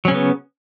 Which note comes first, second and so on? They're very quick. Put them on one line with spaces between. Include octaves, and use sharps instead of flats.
F#3 C#4 C#3 B3